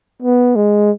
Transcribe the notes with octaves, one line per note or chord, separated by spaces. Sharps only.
B3
G#3